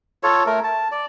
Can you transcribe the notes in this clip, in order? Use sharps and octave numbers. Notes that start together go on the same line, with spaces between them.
F4 A4 C#5
A3 A#4
A5
D5